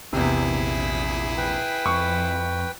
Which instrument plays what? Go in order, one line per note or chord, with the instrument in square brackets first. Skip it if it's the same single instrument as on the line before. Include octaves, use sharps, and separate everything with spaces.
[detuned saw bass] A#1 [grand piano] E2 C3 [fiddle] E4 G#4
[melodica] B4 G5
[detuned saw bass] F2 [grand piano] C#6